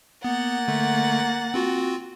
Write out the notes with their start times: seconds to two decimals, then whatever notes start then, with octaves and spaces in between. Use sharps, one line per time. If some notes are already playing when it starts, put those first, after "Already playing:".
0.24 A#3 B3 F#5 A6
0.68 D3 A3
1.54 C4 F4 F#4